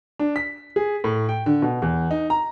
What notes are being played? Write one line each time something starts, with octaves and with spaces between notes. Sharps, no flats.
D4
B6
G#4
A2
G5
D3
B2
E2
D#4
A#5